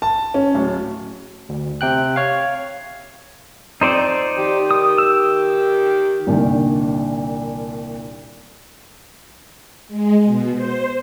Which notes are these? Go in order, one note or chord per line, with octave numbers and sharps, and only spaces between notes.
A5
C#4
D1
D2
C3 G5 F#6
C#5 F5
F2 C4 D#4 C5 D5
D#3 G4
D#6
E6
C2 A#2 D3 D#3
G#3
B2
C5